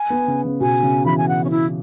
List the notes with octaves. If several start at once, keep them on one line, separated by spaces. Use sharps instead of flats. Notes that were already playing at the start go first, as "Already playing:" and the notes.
Already playing: G#5
B3
C#3
C#3
B2 G#5
C#3
E3 B5
G#5
F#5
C#4
E4